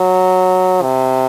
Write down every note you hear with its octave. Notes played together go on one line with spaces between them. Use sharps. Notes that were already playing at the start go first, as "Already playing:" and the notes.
Already playing: F#3
C3